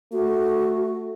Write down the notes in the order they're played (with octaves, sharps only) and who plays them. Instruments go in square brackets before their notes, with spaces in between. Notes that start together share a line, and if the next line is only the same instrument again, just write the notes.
[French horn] A3 [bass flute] F#4